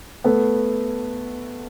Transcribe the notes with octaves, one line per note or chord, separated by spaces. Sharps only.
A3 B3